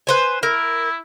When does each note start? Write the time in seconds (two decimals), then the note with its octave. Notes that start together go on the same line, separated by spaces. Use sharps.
0.07 B4 C5 G#5
0.43 E4 A#4